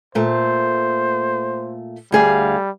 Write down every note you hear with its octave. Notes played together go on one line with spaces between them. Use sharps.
A#2 A3 C5
D2 G3 G#4 F5